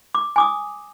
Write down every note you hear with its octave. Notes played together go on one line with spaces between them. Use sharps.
D6
G#5 D6 D#6